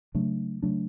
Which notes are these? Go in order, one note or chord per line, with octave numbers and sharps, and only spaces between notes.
C#3 F#3 A3 D4
C#3 F#3 A3 D4